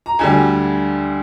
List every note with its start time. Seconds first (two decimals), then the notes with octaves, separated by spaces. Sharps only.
0.06 A#5
0.19 D2 D3 G3 G#5